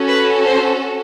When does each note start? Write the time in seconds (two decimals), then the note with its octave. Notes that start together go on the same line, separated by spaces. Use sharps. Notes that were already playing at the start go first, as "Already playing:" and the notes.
Already playing: C#4 F#4 A4
0.09 B4
0.44 C5